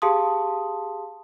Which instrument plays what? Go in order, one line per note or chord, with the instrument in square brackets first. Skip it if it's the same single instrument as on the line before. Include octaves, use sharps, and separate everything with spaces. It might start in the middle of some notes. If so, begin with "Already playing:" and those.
[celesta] G4 G#4 F5 A5 C6 D#6